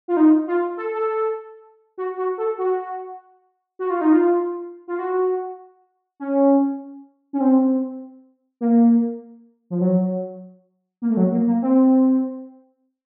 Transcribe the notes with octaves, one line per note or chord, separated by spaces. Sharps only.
F4
D#4
F4
A4
A4
F#4
F#4
A4
F#4
F#4
F4
D#4
F4
F4
F#4
C#4
C#4
C4
A#3
F3
F#3
A#3
A3
F#3
A#3
A#3
C4